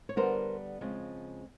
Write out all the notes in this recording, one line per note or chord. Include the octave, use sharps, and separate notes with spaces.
C#5
D3 G3 B3 D4 A#4 C5
C#3 F3 G#3 C4